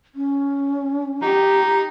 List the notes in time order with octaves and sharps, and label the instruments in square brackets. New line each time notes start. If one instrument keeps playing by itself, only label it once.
[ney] C#4
[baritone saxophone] D#4 [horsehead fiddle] G4